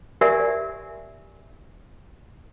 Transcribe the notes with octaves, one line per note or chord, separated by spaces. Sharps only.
G4 A#4 D5 E5 G#5